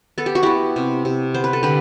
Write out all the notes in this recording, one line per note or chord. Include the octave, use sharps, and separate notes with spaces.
B3 A4
G4
F#4
B3 E4 G4
C3
C3
B3 C5
B4
A4
D3 G4 B4